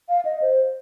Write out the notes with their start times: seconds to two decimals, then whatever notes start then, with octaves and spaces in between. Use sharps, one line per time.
0.09 F5
0.25 D#5
0.42 C5